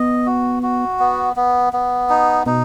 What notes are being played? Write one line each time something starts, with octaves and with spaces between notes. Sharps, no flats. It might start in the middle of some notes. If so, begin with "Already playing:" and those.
Already playing: B3 D#5
F#4
F#4
B3
B3
B3
D#4
B2 D#4